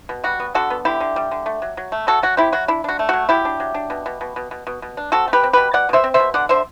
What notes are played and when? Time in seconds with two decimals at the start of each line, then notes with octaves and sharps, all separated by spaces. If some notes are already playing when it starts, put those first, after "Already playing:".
0.09 B2
0.24 G3 F#4
0.40 B3
0.55 D3 F#4 A4
0.70 B3
0.85 D3 E4 G4
1.00 D3
1.16 G3
1.31 D3
1.46 A3
1.62 F#3
1.77 F#3
1.92 A3
2.07 F#3 F#4 A4
2.23 F#3 F#4
2.37 C4 E4 G4
2.52 F#3 F#4
2.68 D4 E4
2.84 D4 F#4
2.99 A3
3.09 F#3 F#4
3.29 F#3 E4 G4
3.45 D4
3.60 F#3
3.74 D4
3.90 B2
4.06 B2
4.21 B2
4.36 B2
4.51 B2
4.67 B2
4.82 B2
4.97 D4
5.12 C4 F#4 A4
5.28 A3
5.33 G4 B4
5.43 C4
5.53 B2 G4 B4
5.73 B2 D5 F#5
5.89 B2 C5 E5
6.04 C4
6.14 C5 E5
6.20 B2
6.34 D3 D5 F#5
6.49 D3 C5 E5